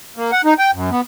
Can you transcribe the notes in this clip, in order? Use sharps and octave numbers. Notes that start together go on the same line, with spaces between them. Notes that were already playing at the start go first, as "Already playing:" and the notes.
A#3
F#5
D#4
G5
F#2
B3